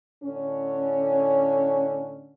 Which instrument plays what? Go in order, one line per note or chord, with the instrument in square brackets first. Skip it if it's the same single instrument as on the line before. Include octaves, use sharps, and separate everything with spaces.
[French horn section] A2 D3 C#4